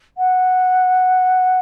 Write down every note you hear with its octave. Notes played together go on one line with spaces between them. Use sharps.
F#5